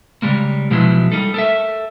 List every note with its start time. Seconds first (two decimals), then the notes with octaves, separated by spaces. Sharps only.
0.22 C#3 G3 G#3 A#3
0.71 B2 F3 F#3 G#3 E4
1.12 G3 A#3 D#4 A4
1.34 A4 A#4 E5